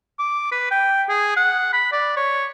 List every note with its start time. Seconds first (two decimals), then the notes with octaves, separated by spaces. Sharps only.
0.19 D6
0.52 B4
0.71 G5
1.09 G#4
1.37 F#5
1.73 B5
1.92 D5
2.17 C#5